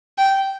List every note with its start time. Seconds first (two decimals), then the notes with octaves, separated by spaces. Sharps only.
0.18 G5